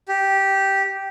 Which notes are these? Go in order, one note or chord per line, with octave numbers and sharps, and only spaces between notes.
G4